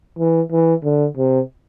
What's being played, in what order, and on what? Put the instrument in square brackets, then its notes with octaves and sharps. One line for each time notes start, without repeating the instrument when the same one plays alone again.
[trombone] E3
E3
D3
C3